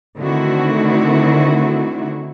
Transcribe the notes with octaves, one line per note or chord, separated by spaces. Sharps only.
D3 D#3 A3 C4 E4 F#4